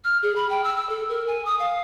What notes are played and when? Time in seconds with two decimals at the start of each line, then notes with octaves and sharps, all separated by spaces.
0.04 F6
0.23 G#4
0.36 B5
0.49 G5
0.64 E6
0.76 E6
0.89 A4
1.09 A#4
1.27 G#5
1.45 D#6
1.59 F5